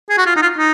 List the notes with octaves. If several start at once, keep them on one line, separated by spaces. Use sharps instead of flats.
G#4
F#4
F4
D#4
F4
D#4